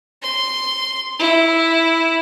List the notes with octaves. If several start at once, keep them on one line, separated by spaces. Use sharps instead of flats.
C6
E4